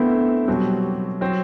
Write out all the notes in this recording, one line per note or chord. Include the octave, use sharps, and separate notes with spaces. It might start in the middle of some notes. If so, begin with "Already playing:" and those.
Already playing: D3 A3 B3 C4 E4
B2 F#3 G3 C4
F#3 C4